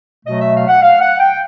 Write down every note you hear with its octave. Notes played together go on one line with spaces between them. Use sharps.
B2 F#3 A3 D#5
E5
F5
F#5
F5
F#5
G5